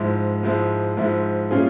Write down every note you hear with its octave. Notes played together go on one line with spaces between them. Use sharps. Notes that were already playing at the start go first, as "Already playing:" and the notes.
Already playing: G#2 F3 G#3 E4
G#2 F3 G#3 E4
G#2 F3 G#3 E4
A#2 G3 C#4 F4 G#4